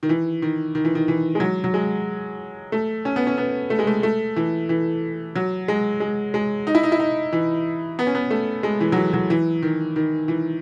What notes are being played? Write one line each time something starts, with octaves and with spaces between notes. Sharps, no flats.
D#3
E3
D#3
D#3
E3
D#3
E3
G#3
F#3
F#3
G#3
A3
C#4
B3
C#4
B3
A3
G#3
A3
A3
E3
E3
F#3
G#3
G#3
G#3
D#4
E4
D#4
E4
D#4
E3
B3
C#4
B3
A3
G#3
E3
F#3
E3
F#3
E3
D#3
D#3
E3